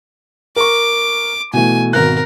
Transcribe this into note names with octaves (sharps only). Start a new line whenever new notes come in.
A#4 C#6 D6
B2 E3 A3 G#5
G#1 B2 A#4 F#6